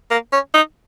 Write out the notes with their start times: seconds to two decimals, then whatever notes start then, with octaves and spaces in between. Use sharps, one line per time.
0.11 A#3
0.33 C#4
0.54 D#4